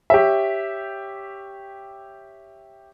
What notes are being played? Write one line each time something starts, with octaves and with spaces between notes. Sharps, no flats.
G4 C#5 E5